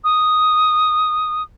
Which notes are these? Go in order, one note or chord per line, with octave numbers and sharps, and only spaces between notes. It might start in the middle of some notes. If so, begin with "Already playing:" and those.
D#6